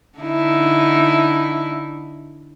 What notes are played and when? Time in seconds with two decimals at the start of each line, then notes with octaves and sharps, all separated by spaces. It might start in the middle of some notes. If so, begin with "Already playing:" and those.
0.19 D3 D#4 E4